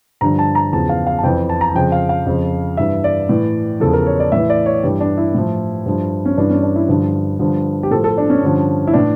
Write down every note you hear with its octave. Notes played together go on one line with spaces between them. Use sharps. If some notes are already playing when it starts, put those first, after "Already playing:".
G2 D3 F3 A#5
A5
A#5
E2 C#3 F3 A5
F5
F5
A5
F2 E3 G5
A5
A#5
A5
F2 C#3 F3 G5
F5
F5
F2 C#3 F3
G2 E3 E5
D5
A2 E3
E2 C#3 F3 A4
A#4
C#5
D5
A2 E3 E5
D5
C#5
G2 E3 G4
D4
E4
A2 F3
G2 F3
C#4
G2 E3 D4
C#4
D4
E4
G2 D3 F3
G2 D3 F3
G4
A2 F3 A4
A4
D4
C#4
G2 D3 F3
E4
A2 E3 D4